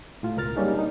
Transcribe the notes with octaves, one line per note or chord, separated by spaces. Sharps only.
A2 F4
C#2 B2 A#4 F6 A6
F#3 G3 A#3 C#4 D#4 G#4
D4 D#4